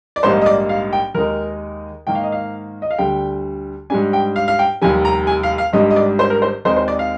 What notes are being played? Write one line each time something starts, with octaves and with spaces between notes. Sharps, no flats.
D5
A#1 G#2 G3 A#3 D#4 C5
D#5
D5
F5
G5
D#2 D#3 G#3 D#4 A#4
G#2 D#3 A#3 G5
F5
D#5
F5
D#5
F5
D2 D3 G3 G5
G#2 G3 D4 G#5
G5
F5
F5
G5
F1 D#2 D#3 G3 G#5
A#5
G#5
F5
F5
G#1 G#2 G3 D4 D#5
D#5
D5
C5
A#4
C5
D#2 D#3 G#3 C4 D#4 C5
C5
D5
F5